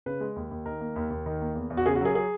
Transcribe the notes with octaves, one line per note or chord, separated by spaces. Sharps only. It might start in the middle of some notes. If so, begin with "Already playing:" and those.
C#3 B4
G#3
D#2
D#2
D#3 A#4
A#3
D#2
D#2
D#3
A#3
E2
E2
F#4
C#3 G#4
F#4
F#3 G#4
G#4